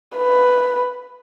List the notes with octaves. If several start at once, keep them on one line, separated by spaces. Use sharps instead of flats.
B4